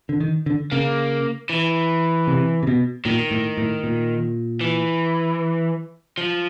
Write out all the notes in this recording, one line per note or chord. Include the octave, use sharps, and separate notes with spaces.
D3
D#3
D3
C#3 A#3
E3
C3
C3
B2
A#2 D#3
A2
A2
A#2
E3
F3